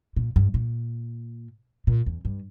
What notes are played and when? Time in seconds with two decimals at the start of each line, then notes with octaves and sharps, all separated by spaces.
0.16 A#2
0.36 G2
0.54 A#2
1.87 A#2
2.06 E2
2.25 G2